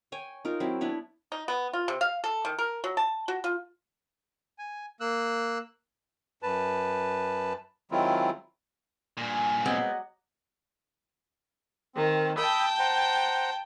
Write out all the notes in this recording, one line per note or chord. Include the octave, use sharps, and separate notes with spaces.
C#5 G5 G#5
D#4 F4 A#4
F#3 C4 E4
B3 D4 E4 C#5
D#4
B3
F4
C3
F5
A4
D#3
A#4
F#3
A5
F#4
F4
G#5
A#3 E6 F#6
F#2 B4 A5
D#3 F#3 G#3 C4 E4 F4
G2 A#2 D5 G#5
F#3 G#3 B3 C4 D#5 F#5
D#3 C4
G5 A5 B5 D#6 E6
C5 F#5 A#5